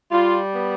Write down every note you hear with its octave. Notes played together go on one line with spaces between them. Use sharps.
G3 F4
B3